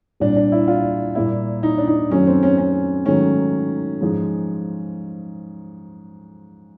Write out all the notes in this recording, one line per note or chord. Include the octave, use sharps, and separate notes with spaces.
C2 A#2 G3 D4
D4
E4
F4
A#2 G3 A#3 E4
D#4
D4
D#4
F#2 D#3 F#3 A3 C#4
C4
C#4
C#4
G#2 D#3 F#3 A3 C#4
G#2 F3 G#3